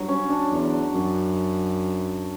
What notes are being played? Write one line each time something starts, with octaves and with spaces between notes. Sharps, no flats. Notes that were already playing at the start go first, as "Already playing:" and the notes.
Already playing: G2 F#3
C#4
D4
E2
F#2